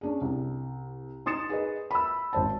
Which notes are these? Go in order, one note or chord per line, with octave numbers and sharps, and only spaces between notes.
C#4 D4 G#4
C2
D#4 C6 D#6 A6 C#7 E7
G#4 B4 D#5
B5 E6
G#1 C5 A5